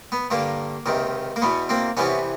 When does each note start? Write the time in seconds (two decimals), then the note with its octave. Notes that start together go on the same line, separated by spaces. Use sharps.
0.12 B3
0.30 G2 D3 A#3
0.86 C#2 C3 D#3
1.36 A#3
1.42 E2 B2 B3
1.69 A#3 C4
1.97 C2 C3 E3 B3 C#4